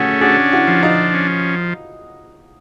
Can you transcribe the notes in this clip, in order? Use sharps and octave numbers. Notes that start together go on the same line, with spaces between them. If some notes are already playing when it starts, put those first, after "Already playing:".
Already playing: A3 C#4 F#4 G#4
D4 F#4 G#4
E4 F#4
F3
D#4 F4
C#4